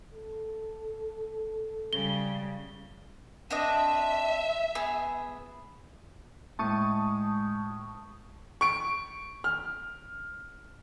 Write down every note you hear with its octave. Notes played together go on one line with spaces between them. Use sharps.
A4
C#3 G3 G7
C4 D4 D#5 E5
B3 G#4 E6
A2 G#3 A5 C#6 D#6
C#6 D7
F6